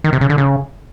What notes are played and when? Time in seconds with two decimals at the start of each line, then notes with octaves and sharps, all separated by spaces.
0.04 D#3
0.13 C3
0.21 C#3
0.29 D3
0.38 C#3